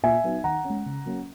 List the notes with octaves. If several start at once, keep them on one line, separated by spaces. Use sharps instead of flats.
A#2 E5 G#5
F#3 B3 D#4
D#3 F#5 A#5
C#4
G#3
C#3
F#3 A#3 C#4